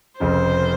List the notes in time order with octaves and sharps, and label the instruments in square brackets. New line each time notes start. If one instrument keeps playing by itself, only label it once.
[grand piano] F1 F2 C#3 [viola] C5